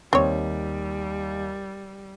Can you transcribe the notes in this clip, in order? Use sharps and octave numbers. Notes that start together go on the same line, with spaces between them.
D#2 G3 C4 C#5